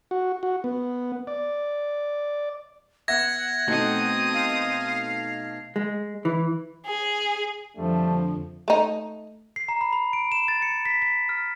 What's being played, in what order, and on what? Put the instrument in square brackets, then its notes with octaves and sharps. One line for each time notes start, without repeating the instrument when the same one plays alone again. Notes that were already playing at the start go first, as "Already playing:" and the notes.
[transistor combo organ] F#4
F#4
B3
D5
[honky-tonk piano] B3 E5 [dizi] F#5 [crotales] G#6 A#6
[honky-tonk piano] B2 A3 D#4 [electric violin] C4 D#6
[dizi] F5
[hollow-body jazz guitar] G#3
E3
[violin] G#4
[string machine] F2 D3 [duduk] F3 [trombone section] G3 A3 D4
[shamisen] A3 D#4
[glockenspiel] C7
A#5
B5
B5
D7
E7
A6
C#7
B6
B6
F6